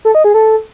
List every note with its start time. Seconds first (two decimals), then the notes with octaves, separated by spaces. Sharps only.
0.05 A4
0.15 D#5
0.24 G#4
0.34 A4